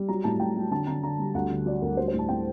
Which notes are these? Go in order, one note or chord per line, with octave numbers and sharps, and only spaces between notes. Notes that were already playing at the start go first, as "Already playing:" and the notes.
Already playing: G3
F#3 A#5
A2 A5
A2 G5
F#3
D3 A5
D3 A#5
D3 A#5
G3
D2 F#5
D3
F#3 D5
D2 A#4
G3 C5
C5
A2
A5
A2 G5